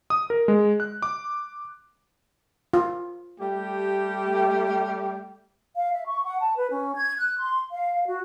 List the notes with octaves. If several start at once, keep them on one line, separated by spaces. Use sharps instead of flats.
D#6
A#4
G#3
F#6
D6
F4
G3 A3 G4
F5
E5
C#6
F#5
A5
B4
C#4
G#6
F#6
C6
F5
F#4